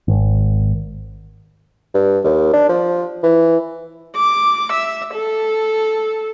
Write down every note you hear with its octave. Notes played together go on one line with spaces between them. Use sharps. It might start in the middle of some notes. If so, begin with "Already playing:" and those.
G#1
G2
D#2
D4
F3
E3
D6
E5
A4